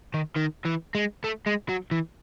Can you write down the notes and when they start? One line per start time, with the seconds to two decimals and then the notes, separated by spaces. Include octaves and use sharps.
0.14 D#3
0.36 D#3
0.65 E3
0.95 G#3
1.24 A3
1.47 G#3
1.69 F#3
1.91 E3